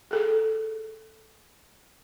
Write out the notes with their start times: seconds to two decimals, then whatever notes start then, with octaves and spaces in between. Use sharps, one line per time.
0.11 G#4 A4